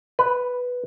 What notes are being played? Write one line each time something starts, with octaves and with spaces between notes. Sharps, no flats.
B4